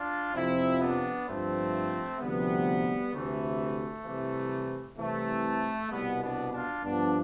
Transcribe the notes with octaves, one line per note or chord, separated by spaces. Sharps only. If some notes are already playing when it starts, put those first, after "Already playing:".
Already playing: D4 F4
F2 C3 F3 C4 E4
B3 D4
G2 F3 A3 C4
D2 C3 F3 G3 B3
D2 C3 E3 A3
C2 C3 E3
C2 C3 E3 A3
C2 B2 G3 B3
B3 D4
D4 F4
G2 F3 B3 D4